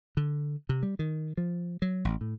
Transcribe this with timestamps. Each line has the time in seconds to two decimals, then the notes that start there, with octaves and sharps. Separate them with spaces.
0.17 D3
0.69 C3
0.83 G3
0.99 D#3
1.37 F3
1.82 F#3
2.05 A1
2.21 A2